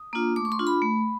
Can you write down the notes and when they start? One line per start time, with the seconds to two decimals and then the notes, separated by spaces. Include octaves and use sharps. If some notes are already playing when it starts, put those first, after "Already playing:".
Already playing: D#6
0.13 A#3 D4 F4
0.36 A3 D6
0.45 C#6
0.52 C6
0.59 D4 F4
0.67 B5
0.82 A3